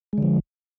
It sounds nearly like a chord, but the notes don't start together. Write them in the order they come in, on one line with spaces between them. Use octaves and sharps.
G#3 D3 F3